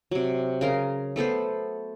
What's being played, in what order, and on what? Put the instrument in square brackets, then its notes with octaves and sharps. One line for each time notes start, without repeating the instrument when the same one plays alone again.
[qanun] C3 F#3
C#3 A#4 C6
A3 B3 A4 C5